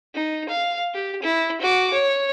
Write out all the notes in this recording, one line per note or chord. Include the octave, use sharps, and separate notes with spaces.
D#4
F5
G4
E4
F#4 D6
C#5